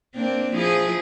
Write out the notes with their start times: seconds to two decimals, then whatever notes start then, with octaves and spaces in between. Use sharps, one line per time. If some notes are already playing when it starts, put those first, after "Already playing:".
0.15 A#3 C4 D4
0.54 F3 E4 G#4